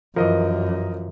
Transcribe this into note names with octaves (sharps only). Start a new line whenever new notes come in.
F#2 E3 F3 A#4 D#5